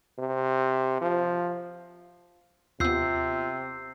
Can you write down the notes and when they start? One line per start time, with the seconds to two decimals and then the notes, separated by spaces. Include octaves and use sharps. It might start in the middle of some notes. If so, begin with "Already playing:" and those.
0.19 C3
1.01 F3
2.80 D#2 C3 B3 F4 E6 G6 C7